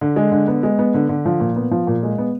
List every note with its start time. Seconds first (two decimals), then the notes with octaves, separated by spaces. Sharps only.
0.01 D3
0.16 G#3
0.32 D3
0.48 B3
0.63 G#3
0.79 B3
0.94 D3
1.09 D3
1.25 F3
1.40 A#2
1.56 B3
1.71 F3
1.87 A#2
2.03 G#3
2.18 B3